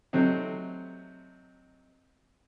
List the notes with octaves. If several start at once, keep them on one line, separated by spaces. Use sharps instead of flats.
C3 F#3 A3 C4 D#4